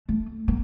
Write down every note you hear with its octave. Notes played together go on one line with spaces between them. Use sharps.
A3
A#3